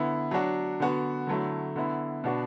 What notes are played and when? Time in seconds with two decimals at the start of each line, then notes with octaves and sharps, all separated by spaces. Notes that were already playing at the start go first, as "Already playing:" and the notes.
Already playing: D3 B3 E4
0.31 F#3 D4 F#4
0.80 D3 B3 F#4
1.27 D3 F#3 A3 E4
1.76 D3 B3 E4
2.24 B2 B3 D4 F#4